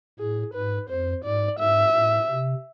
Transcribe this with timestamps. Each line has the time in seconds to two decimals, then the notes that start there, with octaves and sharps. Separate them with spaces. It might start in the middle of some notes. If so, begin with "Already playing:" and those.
0.19 A2 G#4
0.54 G#2 B4
0.89 F2 C5
1.24 G#2 D5
1.59 G#2 E5
1.94 A2
2.30 C3